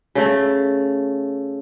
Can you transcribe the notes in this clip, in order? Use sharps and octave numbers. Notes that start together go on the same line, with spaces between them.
C#3 A3